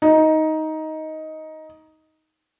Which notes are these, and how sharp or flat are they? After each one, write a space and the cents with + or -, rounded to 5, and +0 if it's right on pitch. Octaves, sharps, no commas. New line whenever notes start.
D#4 +10